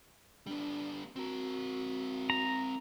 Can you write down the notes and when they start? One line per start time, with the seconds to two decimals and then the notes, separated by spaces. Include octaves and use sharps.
0.47 G3 B3 D4
1.16 C4 F#4 A#4
2.30 A#5